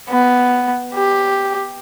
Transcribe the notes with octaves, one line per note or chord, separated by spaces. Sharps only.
B3
G4